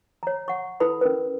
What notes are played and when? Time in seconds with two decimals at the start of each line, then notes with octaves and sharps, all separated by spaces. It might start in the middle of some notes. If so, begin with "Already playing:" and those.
0.23 C#5 A#5
0.48 F#5 C#6
0.80 E4 A4 B4 B5
1.01 C#4 A#4 B4